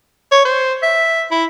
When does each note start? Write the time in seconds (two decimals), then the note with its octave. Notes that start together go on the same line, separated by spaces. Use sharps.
0.31 C#5
0.45 C5
0.83 E5
1.31 E4